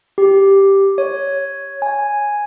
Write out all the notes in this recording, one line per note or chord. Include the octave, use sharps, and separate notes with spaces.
G4
C#5
G#5